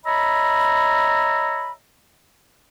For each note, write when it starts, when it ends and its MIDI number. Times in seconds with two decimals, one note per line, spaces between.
0.05 1.72 73
0.05 1.72 75
0.05 1.72 76
0.05 1.72 82
0.05 1.72 83